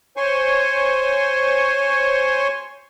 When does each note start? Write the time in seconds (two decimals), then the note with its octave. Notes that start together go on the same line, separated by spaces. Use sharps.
0.17 C5 C#5 G#5 C6 C#6